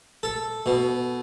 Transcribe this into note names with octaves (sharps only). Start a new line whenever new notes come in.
A4
B2